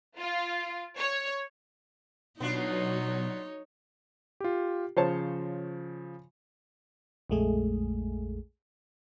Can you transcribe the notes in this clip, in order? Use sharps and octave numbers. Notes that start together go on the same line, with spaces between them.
F4
C#5
B2 F#3 B3 D4 D#4 F4 C#5
F4 G4
C#3 F3 C5 C#5 A5
A#1 F2 G#3 A3 G#4